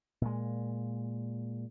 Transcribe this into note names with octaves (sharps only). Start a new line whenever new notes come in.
A#2 G#3